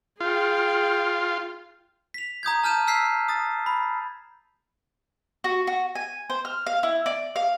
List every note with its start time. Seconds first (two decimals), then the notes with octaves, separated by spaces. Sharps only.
0.21 F4 G#4 G5
2.14 B6 F7
2.43 A#5 D#6 G6 G#6
2.63 A5 F6 G6 D#7 E7
2.87 E6 F6 G6 B6 C7
3.28 D#6 A6
3.66 B5
5.44 F#4
5.67 F#4
5.95 G#5
6.30 C5
6.45 F6
6.67 F5
6.83 E4
7.06 D5
7.36 F5